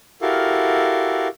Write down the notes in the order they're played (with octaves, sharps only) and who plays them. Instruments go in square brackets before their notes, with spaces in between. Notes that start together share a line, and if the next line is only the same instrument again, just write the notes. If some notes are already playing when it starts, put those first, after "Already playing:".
[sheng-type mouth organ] E4 F#4 G4 A4 A#4 F5